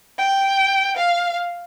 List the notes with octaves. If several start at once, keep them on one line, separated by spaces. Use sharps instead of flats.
G5
F5